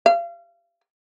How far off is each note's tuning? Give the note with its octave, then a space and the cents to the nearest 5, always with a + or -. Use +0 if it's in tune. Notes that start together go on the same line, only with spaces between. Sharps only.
F5 -30